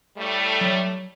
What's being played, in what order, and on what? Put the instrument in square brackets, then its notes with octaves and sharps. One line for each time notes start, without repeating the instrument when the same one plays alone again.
[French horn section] A2 G3 A3
[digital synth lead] F#3